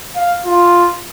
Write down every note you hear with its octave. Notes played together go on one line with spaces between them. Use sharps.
F5
F4